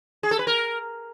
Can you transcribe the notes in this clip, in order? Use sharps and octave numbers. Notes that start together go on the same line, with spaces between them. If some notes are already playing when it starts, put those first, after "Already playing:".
G#4
A4
B4
A#4